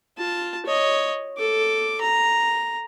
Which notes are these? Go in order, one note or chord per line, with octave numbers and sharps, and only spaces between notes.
F4 A5
C#5 D#5
A4 D6
A#5